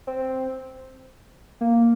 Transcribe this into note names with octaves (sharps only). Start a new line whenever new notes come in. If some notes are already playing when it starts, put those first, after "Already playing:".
C4
A#3